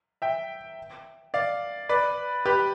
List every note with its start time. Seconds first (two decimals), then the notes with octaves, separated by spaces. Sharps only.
0.22 E5 G5
1.34 D5 F5
1.89 B4 D5
2.46 G4 B4